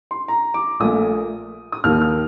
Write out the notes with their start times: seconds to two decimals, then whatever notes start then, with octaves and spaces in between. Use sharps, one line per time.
0.11 C6
0.28 A#5
0.54 D6
0.80 A#1 A#2 A3 D#6
1.72 D#6
1.84 D#2 D#3 A#3 F6
2.02 F6